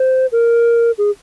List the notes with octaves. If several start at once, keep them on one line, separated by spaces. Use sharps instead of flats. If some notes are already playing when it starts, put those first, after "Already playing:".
Already playing: C5
A#4
G#4